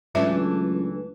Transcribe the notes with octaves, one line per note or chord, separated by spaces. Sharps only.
C#2 E3 F#3 A3 D4 E5